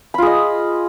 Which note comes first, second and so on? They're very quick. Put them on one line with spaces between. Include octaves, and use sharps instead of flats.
B5 F4 G#4 D#5